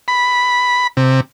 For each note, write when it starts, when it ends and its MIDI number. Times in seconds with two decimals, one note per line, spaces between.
0.08 0.87 83
0.97 1.20 48